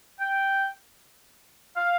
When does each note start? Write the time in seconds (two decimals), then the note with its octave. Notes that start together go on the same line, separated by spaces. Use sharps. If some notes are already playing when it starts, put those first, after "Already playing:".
0.19 G5
1.76 F5